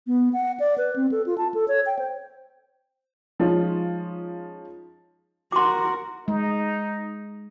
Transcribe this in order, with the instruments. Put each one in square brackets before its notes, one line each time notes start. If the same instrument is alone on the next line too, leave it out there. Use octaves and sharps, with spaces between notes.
[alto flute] B3
F#5
D5
B4
C4
A4
F4
A5
A4
C#5
G5
C5
[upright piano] F3 G#3 C#4 D#4 F4
[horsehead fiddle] F#4 A#4 [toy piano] C6 D6
[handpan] G#3 [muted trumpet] D#4